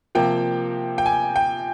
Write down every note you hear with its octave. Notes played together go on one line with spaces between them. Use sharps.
C3 F3 A#3 G5
G5
G#5
G5